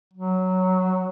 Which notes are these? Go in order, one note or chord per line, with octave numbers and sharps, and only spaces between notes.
F#3